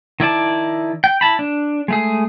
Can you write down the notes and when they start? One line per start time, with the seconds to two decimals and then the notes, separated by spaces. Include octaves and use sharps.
0.20 D#3 E4 D5 A5
1.04 G5
1.21 E4 A5 B5
1.39 D4
1.88 G#3 A3 G#4